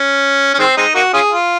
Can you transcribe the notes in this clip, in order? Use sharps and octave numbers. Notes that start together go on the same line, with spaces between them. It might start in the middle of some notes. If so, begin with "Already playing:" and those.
Already playing: C#4
C#4
D#3 G#3 C4
G#3 C4 D#4
A#3 D#4 F#4
C#4 F4 G#4
F4